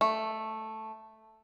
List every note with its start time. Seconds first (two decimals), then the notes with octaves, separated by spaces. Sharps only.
0.01 A3